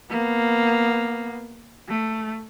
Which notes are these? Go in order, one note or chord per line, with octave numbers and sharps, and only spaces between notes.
A#3 B3
A3